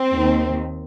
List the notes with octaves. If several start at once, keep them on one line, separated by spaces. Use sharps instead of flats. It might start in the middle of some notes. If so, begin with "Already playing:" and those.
Already playing: C4
D#2 D#3